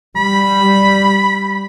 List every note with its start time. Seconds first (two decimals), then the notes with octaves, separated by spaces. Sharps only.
0.16 G3 B5